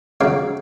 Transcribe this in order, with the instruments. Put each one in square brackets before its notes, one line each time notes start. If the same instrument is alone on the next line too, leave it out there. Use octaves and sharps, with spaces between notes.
[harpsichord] F2 C#3 F#3 C#5 F5